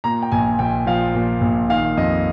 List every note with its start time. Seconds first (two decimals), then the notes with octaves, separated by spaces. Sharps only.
0.04 A#2 A#5
0.22 G5
0.32 A#1 G#5
0.59 A#1 G5
0.86 F3 F5
1.15 A#2
1.41 A#1
1.69 D#3 F5
1.97 F2 D#5